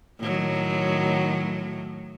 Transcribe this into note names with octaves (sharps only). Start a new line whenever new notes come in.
A2 D#3 F#3